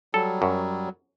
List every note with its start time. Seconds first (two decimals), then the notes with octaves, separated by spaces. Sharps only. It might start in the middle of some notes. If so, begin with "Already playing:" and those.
0.14 F#3 G3 A4
0.42 F#2